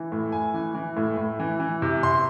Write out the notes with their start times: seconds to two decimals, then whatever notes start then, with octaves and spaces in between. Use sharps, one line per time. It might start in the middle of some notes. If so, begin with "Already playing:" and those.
Already playing: E3
0.12 A2
0.32 A2 G#5
0.54 E3
0.75 E3
0.97 A2
1.17 A2
1.40 E3
1.60 E3
1.82 C3
2.03 C3 C6